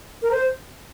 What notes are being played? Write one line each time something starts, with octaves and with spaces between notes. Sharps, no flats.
A#4
C5